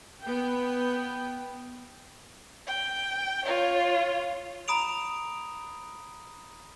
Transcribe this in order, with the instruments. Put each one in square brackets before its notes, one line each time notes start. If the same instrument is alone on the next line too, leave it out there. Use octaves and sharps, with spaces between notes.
[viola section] B3 G5
[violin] G5
F4 C#5
[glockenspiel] A#5 B5 D#6 D7 F7